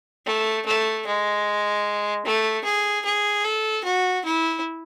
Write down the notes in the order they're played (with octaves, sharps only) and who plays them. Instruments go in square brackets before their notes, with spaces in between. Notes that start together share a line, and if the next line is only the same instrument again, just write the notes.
[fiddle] A3
A3
G#3
A3
G#4
G#4
A4
F#4
E4